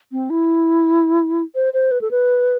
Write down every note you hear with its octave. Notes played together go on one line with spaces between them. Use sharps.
C4
E4
C5
C5
B4
A4
B4